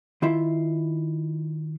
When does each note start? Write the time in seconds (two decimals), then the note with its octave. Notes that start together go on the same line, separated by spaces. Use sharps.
0.22 D#3 E4 F4 E5